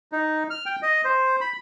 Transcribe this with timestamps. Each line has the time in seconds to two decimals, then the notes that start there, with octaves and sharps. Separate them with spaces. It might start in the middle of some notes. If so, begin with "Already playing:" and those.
0.12 D#4
0.50 F6
0.66 G5
0.82 D#5
1.04 C5
1.41 B5